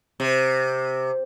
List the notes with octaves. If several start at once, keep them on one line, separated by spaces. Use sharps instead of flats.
C3